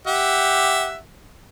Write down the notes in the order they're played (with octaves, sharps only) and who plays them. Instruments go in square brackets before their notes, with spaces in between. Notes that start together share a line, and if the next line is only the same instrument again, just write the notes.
[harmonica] G4 E5 F#5